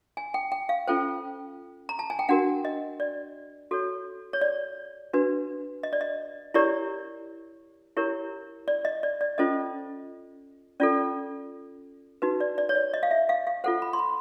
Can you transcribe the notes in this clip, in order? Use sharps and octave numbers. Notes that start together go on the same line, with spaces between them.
G#5
G5
G5
F5
C#4 F4 A4 C5 G5
A#5
A5
G#5
G5
D4 F#4 A#4 F#5
D#5
D5
F#4 A4 C#5
C#5
D5
D4 F#4 B4
D#5
D5
D#5
E4 G4 A#4 C#5 D5
E4 G4 A#4 C#5
D5
D#5
D5
D5
C#4 F4 A4 C5 D#5
C#4 F4 A4 D5
D#4 F#4 B4
D5
D5
C#5
D5
D#5
F5
E5
F5
F5
F4 A4 C5 F#5
B5
C6
B5